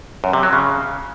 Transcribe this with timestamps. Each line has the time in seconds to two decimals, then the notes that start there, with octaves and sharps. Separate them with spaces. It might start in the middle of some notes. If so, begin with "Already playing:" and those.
0.24 F#2
0.33 C3
0.43 F#3
0.53 C#3